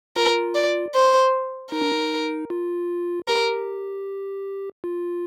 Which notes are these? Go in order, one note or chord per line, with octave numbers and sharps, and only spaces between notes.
F4 A#4
D5
C5
D#4 A#4
D4
D#4
F4
G4 A#4
F4